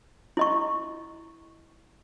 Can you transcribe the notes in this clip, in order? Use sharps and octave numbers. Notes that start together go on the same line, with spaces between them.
E4 D#5 C#6